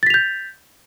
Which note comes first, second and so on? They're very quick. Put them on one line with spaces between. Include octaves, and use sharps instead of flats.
A6 B6 F7 G6